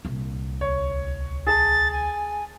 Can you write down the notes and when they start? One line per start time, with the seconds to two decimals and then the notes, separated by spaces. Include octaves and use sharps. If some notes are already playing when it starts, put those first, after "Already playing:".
0.05 C2 A#2
0.61 D2 C#5
1.47 G#4 A5 A6
1.92 G#5